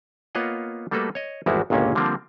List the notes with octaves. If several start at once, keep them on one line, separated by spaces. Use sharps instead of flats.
A#3 B3 F4 C#5 D#5 F#5
G3 A3 A#3 F#4 A4 B4
C#5 D#5
G#1 E2 G3 G#3 E4 F#4
G1 C#2 A#2 A#3 C#4
D3 F3 G3 A#3 C4 D4